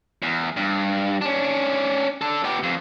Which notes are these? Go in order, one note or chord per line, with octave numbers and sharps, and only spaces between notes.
E2
G2
C#4 D4
D4 A4
B3 G4
F2